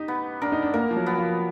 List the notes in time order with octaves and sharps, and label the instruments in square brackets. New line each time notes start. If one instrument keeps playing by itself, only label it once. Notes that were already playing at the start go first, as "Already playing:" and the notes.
Already playing: [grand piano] D#4 [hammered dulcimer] G4
[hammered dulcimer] B3
[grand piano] D4 [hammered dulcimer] A#4
[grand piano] D#4
D4
[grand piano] A#3 [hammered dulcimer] A#4
[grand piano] F3
F#3
[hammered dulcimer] B3
[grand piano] F3